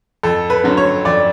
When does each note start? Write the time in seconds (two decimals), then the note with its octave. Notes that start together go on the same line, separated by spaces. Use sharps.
0.23 F2 A4
0.50 B4
0.64 D3 F#3 C#4
0.77 C#5
1.05 F2 D5